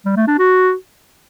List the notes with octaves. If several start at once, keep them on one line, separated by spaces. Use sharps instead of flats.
G3
A3
D4
F#4